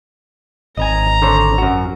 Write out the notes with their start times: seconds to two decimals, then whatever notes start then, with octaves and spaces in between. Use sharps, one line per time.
0.77 G#1 D#5 G#5 A#5
1.22 D3 C5 C#5
1.58 F#2 F#4